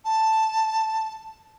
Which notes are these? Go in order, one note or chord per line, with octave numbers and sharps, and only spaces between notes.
A5